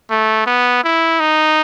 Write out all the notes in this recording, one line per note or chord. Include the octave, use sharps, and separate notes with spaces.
A3
B3
E4
D#4